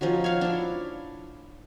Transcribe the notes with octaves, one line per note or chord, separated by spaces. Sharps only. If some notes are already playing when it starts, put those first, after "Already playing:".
F3 C#4 D#4 F#4
C#5 F5
D4 E4